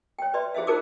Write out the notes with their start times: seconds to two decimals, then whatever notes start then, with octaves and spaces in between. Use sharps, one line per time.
0.19 C#5 G5
0.34 B4 D5 E5 C6
0.54 E4 G#4 C5 E5 F5
0.67 D#4 F4 G#4 A#4 C5 D6